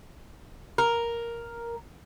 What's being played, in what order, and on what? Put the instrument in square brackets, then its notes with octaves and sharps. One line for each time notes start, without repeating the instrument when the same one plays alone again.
[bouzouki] A#4